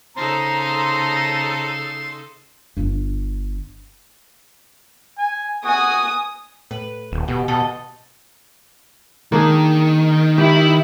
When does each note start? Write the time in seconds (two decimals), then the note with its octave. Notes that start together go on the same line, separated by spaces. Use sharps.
0.17 C#3 D#4 A4 C5 A5 A#5 C6
2.77 G1 D4
5.18 G#5
5.65 F#4 G#5 D#6
6.71 A2 B4
7.12 D#1
7.28 B2 G4
7.48 B2 A4 D#5
9.32 D#3 A#3 D4 G#4
10.38 E4 G4